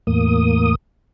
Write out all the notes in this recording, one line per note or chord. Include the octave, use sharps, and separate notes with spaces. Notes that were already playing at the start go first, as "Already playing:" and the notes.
E2 A2 A#3 D#6